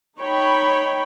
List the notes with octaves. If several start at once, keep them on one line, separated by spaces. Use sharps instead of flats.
D#4 C#5 G5 B5